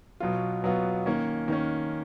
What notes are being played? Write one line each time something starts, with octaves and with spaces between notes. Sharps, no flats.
B2 F#3 B3 F4
B2 F#3 B3 F4
D#3 A#3 C#4
D#3 A#3 C#4